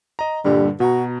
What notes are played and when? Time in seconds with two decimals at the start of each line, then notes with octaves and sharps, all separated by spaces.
0.19 D#5 A#5
0.45 G2 A#2 D3 G3
0.80 B2 F#4 A#5